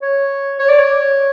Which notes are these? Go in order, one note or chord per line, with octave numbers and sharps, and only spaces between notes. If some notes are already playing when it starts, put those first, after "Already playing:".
C#5
C#5
D5
C#5